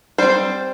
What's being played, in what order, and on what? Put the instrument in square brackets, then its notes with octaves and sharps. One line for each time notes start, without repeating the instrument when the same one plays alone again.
[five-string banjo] G3 C4 C5